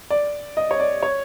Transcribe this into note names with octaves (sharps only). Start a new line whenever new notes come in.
D5
D#5
C#5
D5
C#5